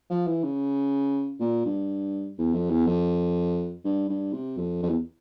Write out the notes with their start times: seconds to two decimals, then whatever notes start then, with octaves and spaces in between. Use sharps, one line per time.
0.10 F3
0.27 E3
0.43 C#3
1.40 A#2
1.65 G2
2.38 E2
2.54 F2
2.70 E2
2.87 F2
3.85 G2
4.09 G2
4.33 C3
4.58 F2
4.83 F2
4.89 E2